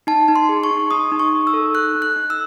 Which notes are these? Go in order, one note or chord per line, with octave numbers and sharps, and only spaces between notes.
D#4 A5
D#4
C6
G#4
C#6
D#4
D#4 D#6
D#4
C#6
D#4
E6
A4
A4 F#6
D#4
F#6
D#4
E6